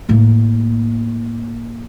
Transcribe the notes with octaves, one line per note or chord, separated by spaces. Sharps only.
A2 A#3